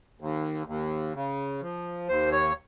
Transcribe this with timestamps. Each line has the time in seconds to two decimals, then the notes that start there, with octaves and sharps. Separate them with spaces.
0.20 D#2
0.67 D#2
1.15 C#3
1.62 F3
2.08 D#2 C5
2.32 C#5